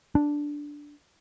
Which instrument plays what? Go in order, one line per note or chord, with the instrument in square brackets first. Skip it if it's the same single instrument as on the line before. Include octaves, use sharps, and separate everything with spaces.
[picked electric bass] D4